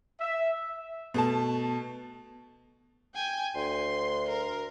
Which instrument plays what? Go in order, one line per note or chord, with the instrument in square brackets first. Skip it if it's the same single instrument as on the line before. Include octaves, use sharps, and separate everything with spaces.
[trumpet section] E5
[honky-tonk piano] B2 A3 A5
[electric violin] G5 G#5
[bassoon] D2 [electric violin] C6
[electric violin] A#4